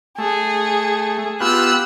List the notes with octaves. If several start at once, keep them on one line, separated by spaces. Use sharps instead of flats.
A3 G#4
B3 F4 G4 E6 F#6